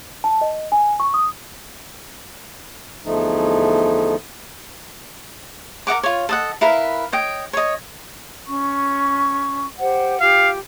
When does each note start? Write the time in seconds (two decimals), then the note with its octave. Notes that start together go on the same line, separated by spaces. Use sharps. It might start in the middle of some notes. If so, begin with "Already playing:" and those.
0.24 A5
0.41 D#5
0.72 G#5
1.00 C#6
1.14 D#6
3.05 E2 D3 F3 A3 D#4
5.87 A#4 D#5 F#5 D6
6.03 F4 C#5
6.29 A4 D#5 F#5
6.61 E4 A#4 B4 F5
7.12 C#5 D#5 G5
7.53 C#5 D#5
8.46 C#4 C#6
9.79 G4 C5 F#5
10.21 F4 G4 F5